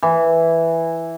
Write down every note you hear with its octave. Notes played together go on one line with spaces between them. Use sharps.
E3